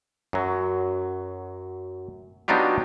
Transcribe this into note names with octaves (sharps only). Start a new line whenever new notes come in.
F#2 F#3
F#3 B3 D4 D#4 F4 G4